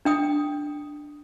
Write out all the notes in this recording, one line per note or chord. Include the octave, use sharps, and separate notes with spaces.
D4 G5 D#6